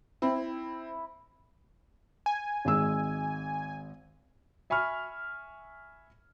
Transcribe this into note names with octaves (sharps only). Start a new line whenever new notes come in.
C4 E4
G#5
G#1 G#3 E6
E5 G#5 B5 C#6 F6